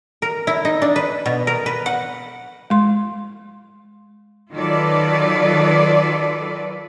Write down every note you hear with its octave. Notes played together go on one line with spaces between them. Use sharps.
A#4
E4
D#4
D4
B4
B2
A#4
B4
F#5
G#3 C6
D#3 F#3 F4 A4 B4 D5